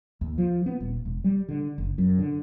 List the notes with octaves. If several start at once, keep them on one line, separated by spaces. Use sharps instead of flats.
D#2
F3
B3
D#1
E1
G3
D3
F#1
F#2
D3